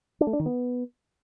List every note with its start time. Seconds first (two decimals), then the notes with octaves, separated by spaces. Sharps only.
0.21 D4
0.27 A3
0.33 D4
0.39 D#3
0.46 B3